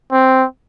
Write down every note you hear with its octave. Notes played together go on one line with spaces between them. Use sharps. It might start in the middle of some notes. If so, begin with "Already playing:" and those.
C4